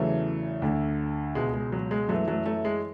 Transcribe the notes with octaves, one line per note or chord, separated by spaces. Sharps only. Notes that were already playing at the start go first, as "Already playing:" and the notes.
Already playing: E2 C#3 E3 F#3 A3
D2 D3
C#2 B2 G#3
G#3
F#3
G#3
F#2 E3 F#3 A3
F#3 A3
F#3 A3
G#3